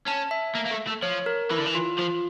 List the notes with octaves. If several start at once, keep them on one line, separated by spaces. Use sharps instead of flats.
C#4 A5
E5
A#3
A#3
A3
A3
F3 C#5
A#4
E3 E4
D3
E3
F4
F3 F4